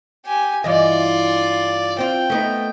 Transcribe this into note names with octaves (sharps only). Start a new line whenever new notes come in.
G4 G#5
G2 E3 F4 D5 D#5
C4 F4 G5
A3 B3 D#4